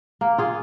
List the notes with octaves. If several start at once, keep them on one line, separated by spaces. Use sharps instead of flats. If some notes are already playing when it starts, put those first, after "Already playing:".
A#3
F4 G#4 F5